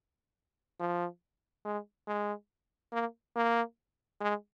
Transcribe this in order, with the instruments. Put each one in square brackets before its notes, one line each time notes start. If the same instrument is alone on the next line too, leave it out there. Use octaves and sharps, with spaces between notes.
[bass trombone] F3
G#3
G#3
A#3
A#3
G#3